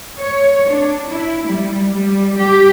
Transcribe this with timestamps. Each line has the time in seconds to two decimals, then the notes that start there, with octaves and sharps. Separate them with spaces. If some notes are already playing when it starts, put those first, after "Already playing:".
0.19 C#5
0.68 D4
1.09 E4
1.47 G3
1.91 G3
2.38 G4